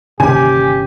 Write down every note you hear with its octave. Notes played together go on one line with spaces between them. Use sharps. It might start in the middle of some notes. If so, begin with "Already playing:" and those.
G1 C3 D#3 E3 A#3 C#4 G4 G#5